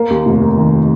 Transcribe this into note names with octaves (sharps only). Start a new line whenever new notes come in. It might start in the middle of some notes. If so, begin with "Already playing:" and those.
Already playing: A#3
D#2
F1
A#3
D#3